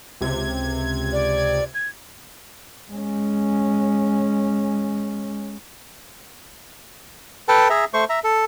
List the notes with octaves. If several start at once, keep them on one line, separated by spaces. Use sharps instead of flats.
C#2 C3 G#6
D5
G#6
G#3 C#4
A4 B4 G5 A5
G#4 E5 A#5
A3 C5 C#6
E5 A#5
A4